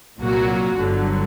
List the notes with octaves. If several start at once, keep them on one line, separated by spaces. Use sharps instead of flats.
C2 A#2 F#3 A#3 F#4
G1 G2 D3 F#3